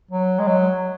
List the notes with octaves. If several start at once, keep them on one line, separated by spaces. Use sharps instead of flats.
F#3
G#3
F#3